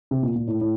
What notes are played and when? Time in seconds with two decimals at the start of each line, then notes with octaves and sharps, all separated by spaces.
0.11 C3
0.23 A#2
0.35 A#2
0.48 A2
0.61 A2